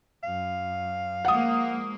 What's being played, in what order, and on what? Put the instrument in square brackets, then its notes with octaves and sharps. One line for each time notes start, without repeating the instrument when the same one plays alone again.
[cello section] F#2 [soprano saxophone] F5
[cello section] F3 G#3 A#3 [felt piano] F#5 D#6